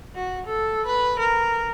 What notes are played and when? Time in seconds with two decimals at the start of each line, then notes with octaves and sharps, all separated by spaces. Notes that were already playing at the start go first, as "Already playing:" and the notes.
0.15 F#4
0.46 A4
0.86 B4
1.19 A#4